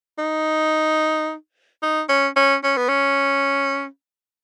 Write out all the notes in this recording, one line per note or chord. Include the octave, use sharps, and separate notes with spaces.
D#4
D#4
C#4
C#4
C#4
B3
C#4